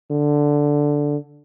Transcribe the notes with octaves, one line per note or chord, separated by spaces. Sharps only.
D3